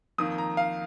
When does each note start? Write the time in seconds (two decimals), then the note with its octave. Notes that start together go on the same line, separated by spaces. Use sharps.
0.18 F2 D#3 A#3 D#6
0.38 A#5
0.57 F5